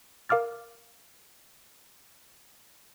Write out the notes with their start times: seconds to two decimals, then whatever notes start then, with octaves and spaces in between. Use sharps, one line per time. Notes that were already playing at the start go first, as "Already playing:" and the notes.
0.29 A#4 F5 D6 F6 A6